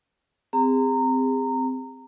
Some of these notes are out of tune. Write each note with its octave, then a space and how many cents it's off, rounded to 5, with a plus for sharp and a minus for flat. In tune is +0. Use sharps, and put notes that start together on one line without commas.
C4 -20 G#4 -40 A#5 -20